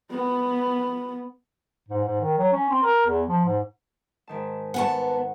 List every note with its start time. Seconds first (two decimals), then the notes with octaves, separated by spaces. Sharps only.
0.11 B3
1.88 G#2
2.04 G#2
2.21 D#3
2.38 F#3
2.53 C#4
2.69 C4
2.82 A#4
3.06 E2
3.27 F3
3.45 G#2
4.27 G#2 D#3 A5
4.74 B3 F#5 G#5 A5 C#6